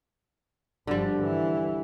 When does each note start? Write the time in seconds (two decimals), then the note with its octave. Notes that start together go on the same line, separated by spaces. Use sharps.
0.87 G1 D3 F3 G3
1.20 E3 E4